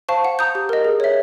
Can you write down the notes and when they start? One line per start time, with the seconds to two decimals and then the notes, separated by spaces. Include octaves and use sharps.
0.09 C5 F5 A5 C#6
0.24 F#5
0.39 A#5 D#6 G6
0.55 G4
0.69 A#4 D#5
0.85 G#4
1.00 C#5 E5